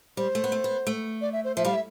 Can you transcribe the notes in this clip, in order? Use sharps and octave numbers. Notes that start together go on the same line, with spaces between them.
G3 C5
A3
B3
A3
B3
A3
D5
E5
C5
F3 E5
G3 F5
E5